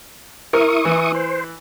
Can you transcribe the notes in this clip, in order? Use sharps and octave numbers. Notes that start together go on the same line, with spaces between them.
E4 A#4 C#6 D#6
E3
C5